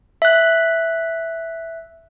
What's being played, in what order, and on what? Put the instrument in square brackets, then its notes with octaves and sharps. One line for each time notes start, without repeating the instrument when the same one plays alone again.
[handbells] E5 F#6